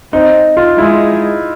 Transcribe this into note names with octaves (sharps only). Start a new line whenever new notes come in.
C4 D#4
F4
G#3 E4